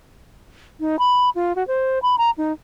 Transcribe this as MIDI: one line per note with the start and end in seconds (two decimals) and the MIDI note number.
0.80 0.96 63
0.99 1.29 83
1.35 1.55 65
1.56 1.66 66
1.68 1.99 72
2.03 2.16 83
2.18 2.30 82
2.38 2.53 63